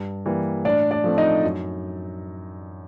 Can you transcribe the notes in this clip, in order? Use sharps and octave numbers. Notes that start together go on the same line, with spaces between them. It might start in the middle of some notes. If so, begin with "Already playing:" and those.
Already playing: G2
E3 G3 A#3
A2 D4 D5
D4 D5
F3 A3 C4
D#4 D#5
F#2